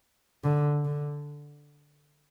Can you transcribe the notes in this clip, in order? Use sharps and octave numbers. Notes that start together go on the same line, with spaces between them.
D3
D3